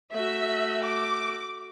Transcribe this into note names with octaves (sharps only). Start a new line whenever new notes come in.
A3 F#4 E5
D6